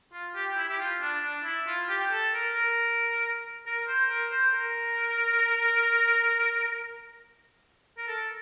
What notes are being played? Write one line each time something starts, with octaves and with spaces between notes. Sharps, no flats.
F4
G4
E4
G4
F4
D4
D4
E4
F4
G4
A4
A#4
A#4
A#4
C5
A#4
C5
A#4
A#4
A4